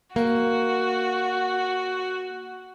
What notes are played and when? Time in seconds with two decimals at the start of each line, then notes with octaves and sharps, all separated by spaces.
0.16 A#3 F#4